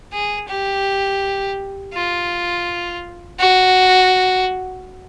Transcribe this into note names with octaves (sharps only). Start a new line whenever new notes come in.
G#4
G4
F4
F#4